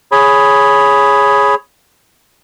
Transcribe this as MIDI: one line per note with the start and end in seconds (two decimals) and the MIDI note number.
0.12 1.55 68
0.12 1.55 73
0.12 1.55 83